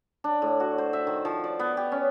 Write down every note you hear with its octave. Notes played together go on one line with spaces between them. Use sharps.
D4
A2
F#4
C5
E5
D#3
F3
D5
B3
G4
C#4